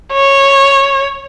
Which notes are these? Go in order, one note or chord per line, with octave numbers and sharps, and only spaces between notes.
C#5